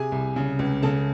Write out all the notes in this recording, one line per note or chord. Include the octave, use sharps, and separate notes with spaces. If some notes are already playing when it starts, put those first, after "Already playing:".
Already playing: C3 G#4 G#5
C2
C#3
C#2
C#3 A4 A5